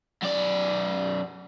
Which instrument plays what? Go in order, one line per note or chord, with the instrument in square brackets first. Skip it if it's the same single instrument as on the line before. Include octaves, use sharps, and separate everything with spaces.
[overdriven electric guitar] F#2 D5